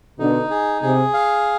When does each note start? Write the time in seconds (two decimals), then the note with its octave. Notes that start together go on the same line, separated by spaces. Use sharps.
0.19 B2 D3 D#4
0.51 G#4
0.82 C3 G#4
1.14 F5